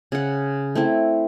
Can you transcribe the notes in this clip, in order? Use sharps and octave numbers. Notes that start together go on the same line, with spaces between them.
C#3 F#5
A3 C4 E4